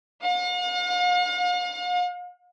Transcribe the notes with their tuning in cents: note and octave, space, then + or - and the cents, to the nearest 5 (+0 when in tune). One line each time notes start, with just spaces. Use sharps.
F5 +45